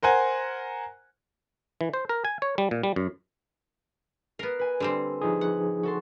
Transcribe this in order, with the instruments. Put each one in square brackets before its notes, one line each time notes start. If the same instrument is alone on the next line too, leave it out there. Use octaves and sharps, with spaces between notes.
[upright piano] A#4 C5 F#5 G#5
[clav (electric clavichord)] E3
C5
A#4
G#5
C#5
G3
A#2
G3
F#2
[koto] B3 A#4 [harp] C7
[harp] B4 G#5
[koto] D3 G3 C4
[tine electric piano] F3 D#4 G#4
[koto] F#5
[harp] F#4 A4 C6